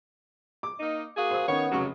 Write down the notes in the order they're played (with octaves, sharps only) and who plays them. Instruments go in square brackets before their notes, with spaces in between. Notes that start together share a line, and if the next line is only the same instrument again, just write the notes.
[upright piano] D6
[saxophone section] A#3 D#4
[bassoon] A#3 [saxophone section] F#4 G#4
[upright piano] C5 D#6
[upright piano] D#3 C#4 [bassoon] B3 [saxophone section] C#5
[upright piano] F1 C#3 C#6 [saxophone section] F#3